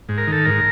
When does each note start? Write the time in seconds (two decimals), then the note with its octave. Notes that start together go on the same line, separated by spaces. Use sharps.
0.09 G#2
0.18 A#4
0.27 D#3 A4
0.45 G#2 A#4